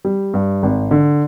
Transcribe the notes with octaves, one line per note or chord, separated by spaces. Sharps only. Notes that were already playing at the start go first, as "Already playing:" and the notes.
G3
G2
G#1
D3